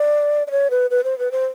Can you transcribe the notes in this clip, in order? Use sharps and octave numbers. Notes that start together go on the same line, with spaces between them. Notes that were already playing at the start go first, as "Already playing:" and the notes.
Already playing: D5
D5
C#5
B4
B4
C5
B4
C5